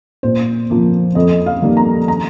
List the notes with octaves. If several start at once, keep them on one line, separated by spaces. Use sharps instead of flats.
A#2 C5
F3 A#3
F2 D#5
F5
D#3 G3 A#3
A#5
A#5